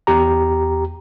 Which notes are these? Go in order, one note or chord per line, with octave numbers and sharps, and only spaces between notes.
E2 G4 A#5